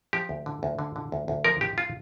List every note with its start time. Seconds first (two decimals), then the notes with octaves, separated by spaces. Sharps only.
0.13 F3 G4
0.29 D2
0.46 D3
0.63 D2
0.79 D3
0.96 D3
1.12 D2
1.28 D2
1.45 F3 A#4
1.61 F3 G4
1.78 F4